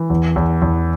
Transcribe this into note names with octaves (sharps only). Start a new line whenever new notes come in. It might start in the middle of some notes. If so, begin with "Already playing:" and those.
Already playing: E3
E2
E2
E2